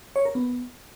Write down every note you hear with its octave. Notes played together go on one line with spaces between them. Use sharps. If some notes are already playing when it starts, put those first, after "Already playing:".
C#5
A#4
B3